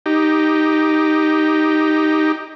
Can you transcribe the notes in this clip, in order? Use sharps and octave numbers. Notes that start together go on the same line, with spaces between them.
D#4 G4